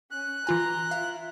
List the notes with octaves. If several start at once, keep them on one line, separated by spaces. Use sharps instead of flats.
C#4 F#6
E3 F4 G#5 A#5 C6
E4 F4 F5